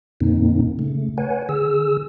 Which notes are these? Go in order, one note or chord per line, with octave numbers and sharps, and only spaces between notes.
F2 A#2 D3 A#3 C4 D#4
C#3 A3
B4 C#5 F#5 G#5
D3 G#4 E6